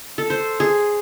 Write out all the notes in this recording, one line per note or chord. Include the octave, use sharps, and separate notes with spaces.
A4
C5
G#4